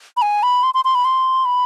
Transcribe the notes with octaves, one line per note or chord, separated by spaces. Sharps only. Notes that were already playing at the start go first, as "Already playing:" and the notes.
B5
G#5
B5
C6
C6
C6
B5
C6
B5